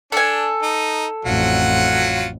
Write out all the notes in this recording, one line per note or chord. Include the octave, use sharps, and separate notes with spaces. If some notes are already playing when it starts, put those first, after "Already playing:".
D4 A4 G#5
D#4
A1 F2 F#3 F4 F#5